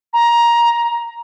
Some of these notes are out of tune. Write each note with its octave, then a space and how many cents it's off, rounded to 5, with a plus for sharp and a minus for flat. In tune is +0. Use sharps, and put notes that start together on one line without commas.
A#5 +15